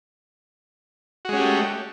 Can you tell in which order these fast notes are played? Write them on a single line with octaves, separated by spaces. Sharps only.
F#4 G#3 C#4 G4 A3